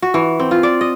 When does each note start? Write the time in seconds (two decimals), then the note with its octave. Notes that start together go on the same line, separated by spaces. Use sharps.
0.02 F#4
0.14 E3
0.39 C4
0.51 F4
0.63 D5
0.81 D#5